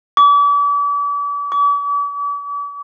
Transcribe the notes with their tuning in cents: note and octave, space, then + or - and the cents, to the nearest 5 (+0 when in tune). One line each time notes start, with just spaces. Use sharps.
D6 -40
D6 -45